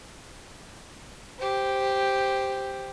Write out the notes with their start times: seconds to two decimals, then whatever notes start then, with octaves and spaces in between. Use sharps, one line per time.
1.39 G4 C5